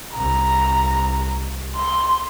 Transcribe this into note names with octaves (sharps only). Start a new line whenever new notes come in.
C2 A#5
C6